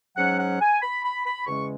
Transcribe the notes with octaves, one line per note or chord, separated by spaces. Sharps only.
G#2 F#3 C#4 F#5
F#5
G#5
B5
B5
B5
E2 C#3 G#3 C#4 C#6